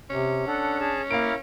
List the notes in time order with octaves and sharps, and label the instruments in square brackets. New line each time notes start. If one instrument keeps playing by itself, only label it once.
[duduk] C3 [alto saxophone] C#4
[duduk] D4 [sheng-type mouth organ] A4 F#5
[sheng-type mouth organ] G#4 A5
[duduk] A#3 [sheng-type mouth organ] E4 A#4 [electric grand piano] F5 D7